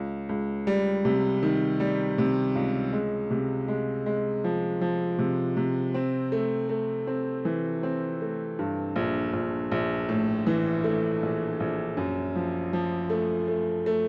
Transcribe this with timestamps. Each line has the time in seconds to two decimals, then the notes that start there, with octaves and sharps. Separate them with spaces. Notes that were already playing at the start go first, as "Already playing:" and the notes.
Already playing: C#2
0.29 C#2
0.67 G3
1.05 C3
1.43 D#3
1.80 G3
2.18 C3
2.55 C#2
2.93 G#3
3.31 C3
3.68 G#3
4.06 G#3
4.44 F3
4.81 F3
5.18 C3
5.57 C3
5.94 C4
6.32 A3
6.69 A3
7.07 C4
7.45 E3
7.83 C4
8.21 A3
8.59 G2
8.96 A#1
9.33 A#1
9.72 A#1
10.09 A2
10.47 E3
10.84 A3
11.23 A#1
11.60 A#1
11.97 F#2
12.36 F3
12.73 F3
13.10 A3
13.48 A3
13.86 A3